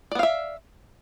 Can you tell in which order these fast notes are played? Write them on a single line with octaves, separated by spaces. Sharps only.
D5 B3 F5 E5